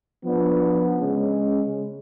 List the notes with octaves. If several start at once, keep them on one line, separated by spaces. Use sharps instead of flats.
F3 B3 D4
C#3 G#3 C#4